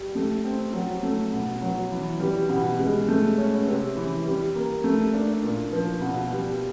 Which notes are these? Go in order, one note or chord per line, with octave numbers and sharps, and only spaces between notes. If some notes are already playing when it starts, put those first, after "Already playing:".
Already playing: G3
A3
C4
F#3
A3
B2
F#3
E3
G3
B2
G#3
A3
C#4
C3
E3
G3
A#3
A3
D4
A#2
F3
B2
G3